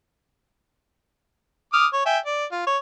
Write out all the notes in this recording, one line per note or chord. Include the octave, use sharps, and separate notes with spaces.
D6 D#6 F6
C#5
E5 G5 G#5
D5
F4
C#5